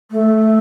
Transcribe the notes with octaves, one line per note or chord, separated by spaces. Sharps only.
A3